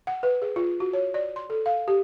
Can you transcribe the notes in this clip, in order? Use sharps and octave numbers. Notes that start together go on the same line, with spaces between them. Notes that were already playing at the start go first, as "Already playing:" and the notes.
F#5
B4
G#4
F4
F#4
C#5
D5
C6
A4
F5
G4